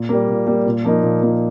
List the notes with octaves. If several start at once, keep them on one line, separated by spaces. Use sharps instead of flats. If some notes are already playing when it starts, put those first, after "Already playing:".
Already playing: A#2
G3 A#3
A#2
G3 A#3
A#2
F3 A#3 D#4
A#2
F3 A#3 D#4